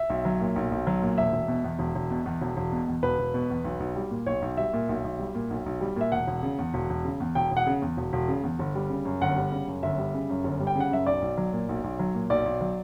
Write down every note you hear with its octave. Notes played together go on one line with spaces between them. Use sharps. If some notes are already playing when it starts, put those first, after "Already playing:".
Already playing: E5
B1
F#3
A#2
B1
B1
F#3
A#2
E1 E5
E1
B2
E2
E1
E1
B2
E2
E1
E1
B2
E2
E1 B4
E1
B2
E2
B1
B1
G3
A#2
B1 C#5
B1
G3 E5
A#2
B1
B1
G3
A#2
B1
B1
G3
A#2 E5
E1 F#5
E1
C#3
E2
E1
E1
C#3
E2
E1 G5
E1
F#5
C#3
E2
E1
E1
C#3
E2
G1
G3
C#3
F#2
G1 F#5
G3
C#3
F#2
G1 E5
G3
C#3
F#2
G1
G3
G5
C#3 F#5
F#2 E5
B1 D5
B1
F#3
A#2
B1
B1
F#3
A#2
B1 D5
B1
F#3